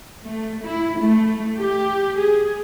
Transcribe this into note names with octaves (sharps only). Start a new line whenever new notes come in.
A3
E4
A3
G4
G#4